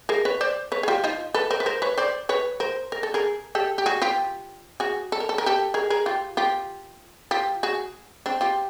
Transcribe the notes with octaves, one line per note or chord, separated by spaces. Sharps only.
G#4 A#4
B4 C#5
C5 D5
B4 C#5
G#4
F4 G4
D#4 F4
A4 B4
A#4 C5
B4
A#4 C5
B4 C#5
C5 D5
B4 C#5
A#4 C5
A#4
A4
G#4 A#4
G4 A4
G4
F#4 G#4
F4 G4
F#4 G#4
A4
A#4
A4
A#4
G4 A4
G#4 A#4
G#4 A#4
F4 G4
F4 G4
F4 G4
F#4 G#4
C4 D4
F4 G4